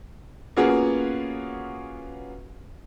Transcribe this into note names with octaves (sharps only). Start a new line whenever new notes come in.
A#3 B3 C#4 F4 F#4 G#4